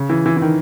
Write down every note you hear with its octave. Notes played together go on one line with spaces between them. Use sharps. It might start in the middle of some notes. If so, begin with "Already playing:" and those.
Already playing: C#3
E3
E3
E3
D#3